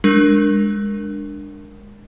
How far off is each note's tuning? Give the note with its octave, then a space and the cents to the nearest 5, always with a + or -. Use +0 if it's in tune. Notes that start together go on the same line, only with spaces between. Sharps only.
G#3 -15 D4 +0 A#4 +0